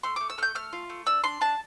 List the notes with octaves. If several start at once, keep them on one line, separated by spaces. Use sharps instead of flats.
A3 C6
A3 D6
E6
A3 F6 G6
A3 F6
F4
A3
D4 E6
D4 C6
D4 A5